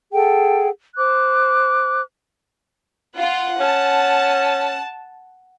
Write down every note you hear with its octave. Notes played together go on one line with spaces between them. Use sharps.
G#4 A4 F#5 G5
C5 D6 F#6
F4 F#5
C#4 A5